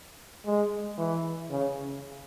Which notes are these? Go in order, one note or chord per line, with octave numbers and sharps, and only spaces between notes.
G#3
E3
C#3